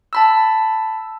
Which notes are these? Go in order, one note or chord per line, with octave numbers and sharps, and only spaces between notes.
A5 B5 E6